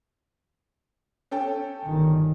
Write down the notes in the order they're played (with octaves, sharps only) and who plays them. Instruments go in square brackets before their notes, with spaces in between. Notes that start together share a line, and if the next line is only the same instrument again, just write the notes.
[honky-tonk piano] C#4 A4 G5
[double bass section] G1 D#3